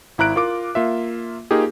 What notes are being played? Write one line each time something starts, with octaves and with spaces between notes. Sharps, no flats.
G#1 E4 A#5 F#6 D7
F4 A#4 D6 D7
A#3 F4 E5
A#3 D#4 F4 G4 G#4